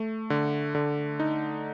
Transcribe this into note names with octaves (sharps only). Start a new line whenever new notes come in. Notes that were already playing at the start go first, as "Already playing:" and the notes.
Already playing: A3
D3
D3
D#4